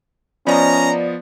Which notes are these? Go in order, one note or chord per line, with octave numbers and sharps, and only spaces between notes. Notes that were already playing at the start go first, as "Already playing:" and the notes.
F3 B3 C#4 D5 D#5 A#5